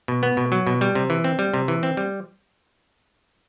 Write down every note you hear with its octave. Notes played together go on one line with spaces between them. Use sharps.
B2
B3
B2
F#3
B2
G3
C3
E3
C4
G3
C3
E3
C4
G3